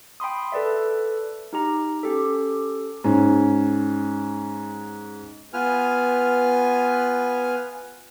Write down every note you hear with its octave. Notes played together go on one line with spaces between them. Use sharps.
G5 B5 C6 D#6
A4 B4 D5 E5
D#4 G4 A#5
C#4 G4 A4
G#2 C#4
B3 F4 B4 G#5 F6